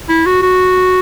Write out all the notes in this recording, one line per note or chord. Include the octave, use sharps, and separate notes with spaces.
E4
F#4
F#4